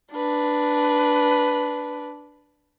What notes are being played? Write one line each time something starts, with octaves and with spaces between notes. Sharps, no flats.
D4 B4